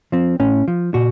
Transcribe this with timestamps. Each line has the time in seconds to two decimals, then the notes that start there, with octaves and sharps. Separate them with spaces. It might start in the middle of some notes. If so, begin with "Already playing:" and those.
0.12 F3 C4
0.40 A2 C#4
0.68 F3
0.94 A#2 F#4